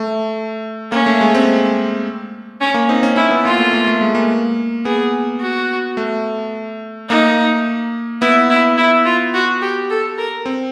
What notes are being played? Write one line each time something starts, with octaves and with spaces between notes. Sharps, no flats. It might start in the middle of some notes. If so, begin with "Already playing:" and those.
Already playing: A3
A#3 C#4
A3
G#3
C4
C#4
A#3
C4 D#4
C#4
C#4 E4
B3
A#3 F4
A3
A#3
A3
G#3
A#3
B3 G#4
F#4
A3
A#3 D#4
B3 E4
E4
E4
F4
F#4
G4
A4
A#4
C4